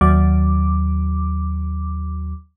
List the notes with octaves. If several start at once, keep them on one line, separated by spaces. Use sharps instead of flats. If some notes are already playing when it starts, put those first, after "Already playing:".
D#2 F#3 D6